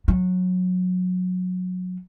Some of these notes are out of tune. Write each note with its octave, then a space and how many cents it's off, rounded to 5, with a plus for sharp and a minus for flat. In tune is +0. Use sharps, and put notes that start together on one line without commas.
F#3 -20